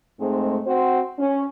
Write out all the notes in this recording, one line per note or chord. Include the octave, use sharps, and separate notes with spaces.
G#2 G#3 A3 C4
C4 F#4 C5
C#4